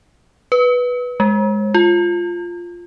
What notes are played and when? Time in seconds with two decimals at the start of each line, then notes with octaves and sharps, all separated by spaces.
0.52 B4
1.20 G#3
1.74 F4